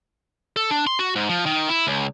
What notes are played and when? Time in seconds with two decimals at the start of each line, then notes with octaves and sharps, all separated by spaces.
0.56 A4
0.71 D4
0.87 C6
0.99 F#4
1.16 G#2
1.29 F3
1.46 D#3
1.69 E4
1.87 C#2